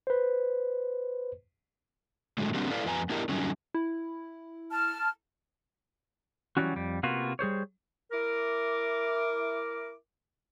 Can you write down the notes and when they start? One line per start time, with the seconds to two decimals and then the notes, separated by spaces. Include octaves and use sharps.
0.07 B4 C5
2.38 A2 D3 F#3 G#3
2.54 D3 G3 A#3 C4 D4 F#4
2.71 E4 A4 B4 D5 F5
2.85 F2 F3 B4 E5 G#5 A#5
3.09 B3 D4 E4 G4 A#4 D#5
3.29 D3 F#3 G3 C#4 D#4 F#4
3.75 E4
4.71 A5 F6
6.57 E3 F#3 G3 C#4 F#4
6.76 F2 G3
7.03 C3 A#3 B3 F4 F#4
7.39 G3 G#4 C5 C#5
8.12 E4 A#4 D6